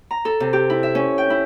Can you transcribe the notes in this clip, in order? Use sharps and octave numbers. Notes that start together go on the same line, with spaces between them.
A#5
A4
C3
G4
E4
E5
C#4
G5
E4